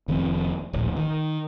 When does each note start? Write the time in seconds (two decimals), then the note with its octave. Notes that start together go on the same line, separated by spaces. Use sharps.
0.08 F1 D#3 F3 C4
0.73 D1 A#1
0.96 D#3